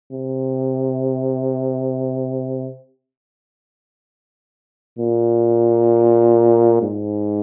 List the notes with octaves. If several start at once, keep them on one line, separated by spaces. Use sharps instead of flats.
C3
A#2
G#2